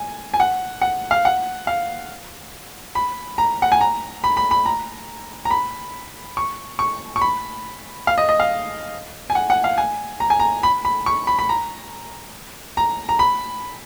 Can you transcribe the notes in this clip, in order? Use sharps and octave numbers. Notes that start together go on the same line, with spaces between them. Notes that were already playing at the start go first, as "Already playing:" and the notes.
Already playing: G#5
G#5
F#5
F#5
F5
F#5
F5
B5
A#5
F#5
G#5
A#5
B5
B5
B5
A#5
A#5
B5
C#6
C#6
C#6
B5
F5
D#5
D#5
F5
G#5
F#5
F#5
F5
G#5
A#5
G#5
A#5
B5
B5
C#6
B5
B5
A#5
A#5
A#5
B5